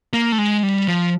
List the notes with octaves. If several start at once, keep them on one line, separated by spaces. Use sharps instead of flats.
A#3
A3
G#3
G3
F3